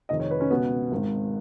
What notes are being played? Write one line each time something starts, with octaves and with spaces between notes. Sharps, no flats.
F1 F2 D#3 D#5
C#5
B4
C#4
C#2 B2 B3
G#1 G#2 D#3